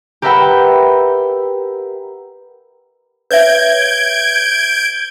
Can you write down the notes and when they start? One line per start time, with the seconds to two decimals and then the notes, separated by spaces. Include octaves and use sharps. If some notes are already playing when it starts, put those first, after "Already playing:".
0.22 G4 A#4 B4 E5 F#5 G5
3.31 B4 C#5 E5 G6 G#6 D7